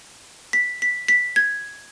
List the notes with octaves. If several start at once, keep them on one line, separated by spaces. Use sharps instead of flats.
B6
B6
B6
G#6